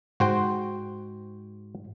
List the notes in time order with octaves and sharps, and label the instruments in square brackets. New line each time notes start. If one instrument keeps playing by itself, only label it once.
[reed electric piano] G#2 [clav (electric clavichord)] F#4 C5 G5